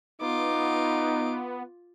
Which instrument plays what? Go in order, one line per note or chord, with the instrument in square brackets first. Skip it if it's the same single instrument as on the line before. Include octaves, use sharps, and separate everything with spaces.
[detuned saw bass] B3 [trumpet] D#4 [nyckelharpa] F4 D6